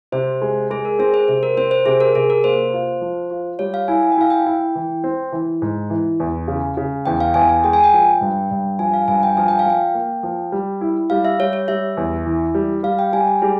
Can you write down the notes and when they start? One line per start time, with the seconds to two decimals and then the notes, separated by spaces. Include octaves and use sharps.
0.12 C3 C5
0.42 G#3
0.70 G#3 G#4
0.85 A#4
0.99 C4 G#4
1.14 C5
1.28 C3 C5
1.43 A#4
1.57 C4 C5
1.71 C5
1.86 C3 G#4
2.00 A#4
2.15 C3 G#4
2.30 A#4
2.44 A#3 C5
2.73 F4
3.01 F3
3.30 F4
3.59 G3 C#5
3.74 F5
3.88 E4 G#5
4.03 G#5
4.12 G5
4.17 E4 F5
4.30 G5
4.46 E4
4.75 E3
5.04 C4
5.32 E3
5.62 G#2
5.90 E3
6.20 E2
6.48 C#3
6.77 C#3
7.06 E2 G5
7.20 F5
7.34 E2 G#5
7.49 G#5
7.64 G#3 G5
7.73 G#5
7.84 G5
7.93 F3
8.21 G2
8.51 G2
8.79 F3 G#5
8.94 F5
9.08 G2 G#5
9.23 G5
9.37 F3 G#5
9.48 G5
9.59 F5
9.66 F3 G5
9.94 A#3
10.23 F3
10.52 G3
10.81 E4
11.10 G3 F5
11.25 E5
11.39 G3 C#5
11.53 C#5
11.68 G3 E5
11.97 E2
12.26 E3
12.55 G3
12.83 G3 F5
12.99 G5
13.13 G3 G#5
13.27 G5
13.42 G3 G#4